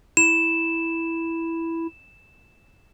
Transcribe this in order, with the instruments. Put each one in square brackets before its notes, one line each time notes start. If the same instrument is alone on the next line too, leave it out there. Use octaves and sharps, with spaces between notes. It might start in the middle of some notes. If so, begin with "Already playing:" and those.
[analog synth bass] E4 [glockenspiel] E7